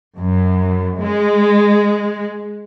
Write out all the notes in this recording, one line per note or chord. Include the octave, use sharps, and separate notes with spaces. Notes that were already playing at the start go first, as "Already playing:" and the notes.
F#2
G#3